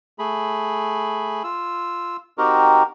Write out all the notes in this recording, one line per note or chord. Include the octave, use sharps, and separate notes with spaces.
A3 G#4 B5
F4 E6
C4 D#4 F#4 G4 A#4